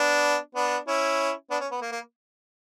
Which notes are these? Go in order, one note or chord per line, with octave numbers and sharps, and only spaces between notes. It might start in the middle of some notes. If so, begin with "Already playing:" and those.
Already playing: B3 D4
B3 D4
C#4 E4
B3 D4
C#4
B3
A#3
A#3